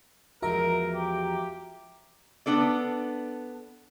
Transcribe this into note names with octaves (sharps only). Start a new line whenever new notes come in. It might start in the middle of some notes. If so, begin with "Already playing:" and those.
E2 F3 G#3 F#4 A#4 E5 A#5
G4
B3 D4 A4 D5